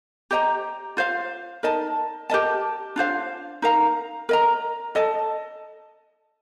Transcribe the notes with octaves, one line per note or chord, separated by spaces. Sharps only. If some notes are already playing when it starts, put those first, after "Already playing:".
G4 C5 D#5 A#5
F4 C5 F5
D#4 A#4 D#5 A5
G4 A#4 D#5 A5
D4 F4 C5 F5
D#4 A#4 F5 A#5
A#4 D#5 A#5
A4 D#5 A5